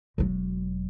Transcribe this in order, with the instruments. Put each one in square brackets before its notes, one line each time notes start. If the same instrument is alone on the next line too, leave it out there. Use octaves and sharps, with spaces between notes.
[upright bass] E1 F#3